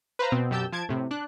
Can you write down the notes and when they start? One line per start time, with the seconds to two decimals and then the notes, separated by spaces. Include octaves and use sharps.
0.19 B4 C5 F5 A#5
0.32 B2 B3 C4
0.51 F#2 B2 G4 A5 E6 G6
0.72 F3 A5 G#6 D7
0.89 A2 C3
1.11 D4 F#6